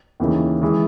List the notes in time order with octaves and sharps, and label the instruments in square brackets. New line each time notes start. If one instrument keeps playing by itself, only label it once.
[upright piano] D#2 C#3 E3 A#3 D#4
E3 G#3